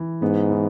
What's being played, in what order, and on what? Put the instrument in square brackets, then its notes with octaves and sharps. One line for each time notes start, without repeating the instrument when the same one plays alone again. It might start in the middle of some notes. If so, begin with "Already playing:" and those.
Already playing: [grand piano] E3
[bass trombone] G#2 [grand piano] B3
[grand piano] E3